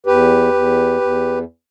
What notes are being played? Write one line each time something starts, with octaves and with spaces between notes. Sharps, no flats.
E2 G4 B4
E2
E2